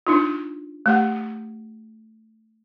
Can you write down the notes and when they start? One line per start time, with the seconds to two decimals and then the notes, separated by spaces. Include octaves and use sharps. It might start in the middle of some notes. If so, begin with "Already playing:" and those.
0.07 D4 D#4 F4
0.86 A3 G4 F#5